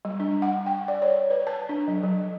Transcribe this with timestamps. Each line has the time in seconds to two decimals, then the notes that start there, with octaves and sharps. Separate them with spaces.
0.05 G3
0.20 D4
0.42 F#5
0.66 G5
0.88 D5
1.02 C#5
1.30 B4
1.47 A5
1.69 D4
1.88 F#3
2.03 F#3